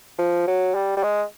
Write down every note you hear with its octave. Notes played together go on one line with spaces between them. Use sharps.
F3
F#3
G3
G3
G#3